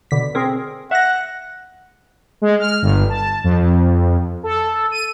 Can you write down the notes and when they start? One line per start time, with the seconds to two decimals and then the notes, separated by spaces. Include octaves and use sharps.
0.11 B2 D3 B6
0.35 C4 G#4 A#4
0.91 E5 F#5 A#6
2.42 G#3
2.59 F6
2.82 G1
3.09 A5
3.44 F2
4.43 A4
4.91 D#7